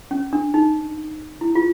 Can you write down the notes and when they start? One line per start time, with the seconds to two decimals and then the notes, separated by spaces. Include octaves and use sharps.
0.11 C#4
0.33 D4
0.54 D#4
1.41 E4
1.55 F4